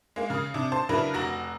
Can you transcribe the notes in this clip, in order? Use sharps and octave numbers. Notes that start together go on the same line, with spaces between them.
G#3 A#3
C#3 D#6
C3 D4
C5 A5
C#3 F#3 D4 E4 A#4 B4
F1 F#4 A#5 A#6